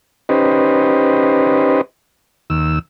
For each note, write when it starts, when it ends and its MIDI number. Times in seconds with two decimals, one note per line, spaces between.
0.29 1.81 61
0.29 1.81 63
0.29 1.81 67
0.29 1.81 71
0.29 1.81 72
0.29 1.81 75
2.50 2.79 39
2.50 2.79 88